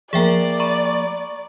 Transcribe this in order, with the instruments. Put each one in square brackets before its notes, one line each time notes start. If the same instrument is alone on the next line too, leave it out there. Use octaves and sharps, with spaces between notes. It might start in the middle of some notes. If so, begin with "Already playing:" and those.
[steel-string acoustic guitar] F3 G#3 A#3 [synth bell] G#4 E5 G5 [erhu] D5
[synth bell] A#5 B5 C#6